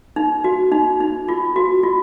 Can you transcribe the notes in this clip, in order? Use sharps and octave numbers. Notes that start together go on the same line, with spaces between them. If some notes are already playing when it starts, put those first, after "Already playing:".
D#4
F#4
D#4
D#4
F4
F#4
F4